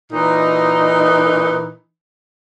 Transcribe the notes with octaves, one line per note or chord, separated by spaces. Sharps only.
A#2 E3 D#4